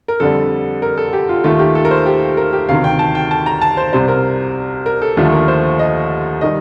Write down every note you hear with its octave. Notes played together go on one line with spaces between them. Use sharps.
A#4
F2 D3 G3 A4
A#4
A4
G4
F4
D#2 D#3 A3 F4
G4
A4
A#4
C5
G4
A#4
G4
D2 C3 D#3 F5
G5
A5
G5
A5
A#5
A5
C5
C2 C3 G3 C5
A#4
A#4
A4
D#2 D3 F3 A3 A4
A#4
C5
D#5
D#3 G3 D#5